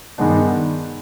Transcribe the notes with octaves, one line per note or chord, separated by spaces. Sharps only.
G2 D#3 G#3 B3 D4